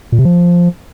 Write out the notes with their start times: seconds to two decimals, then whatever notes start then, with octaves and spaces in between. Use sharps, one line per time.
0.12 A#2
0.19 C3
0.25 F3